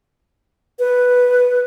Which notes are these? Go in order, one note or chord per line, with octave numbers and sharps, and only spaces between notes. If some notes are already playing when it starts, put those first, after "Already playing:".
B4